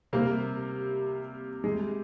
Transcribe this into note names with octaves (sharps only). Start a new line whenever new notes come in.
C3 G3 A#3 C4
G#3